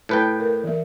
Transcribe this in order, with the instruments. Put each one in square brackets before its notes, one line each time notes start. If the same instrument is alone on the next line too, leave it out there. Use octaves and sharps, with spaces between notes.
[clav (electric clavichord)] A2 B4 G5 [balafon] A5
[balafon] A#4
E3 A#4 E5